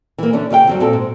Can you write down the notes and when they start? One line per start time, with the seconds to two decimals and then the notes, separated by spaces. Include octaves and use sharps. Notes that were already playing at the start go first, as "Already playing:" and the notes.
0.18 E3 A#3
0.33 D3 E3 C#4 D4
0.50 C#3 A#3 F5 G5
0.67 F2 F#3 G3
0.80 A#2 C4 A4
0.93 G#2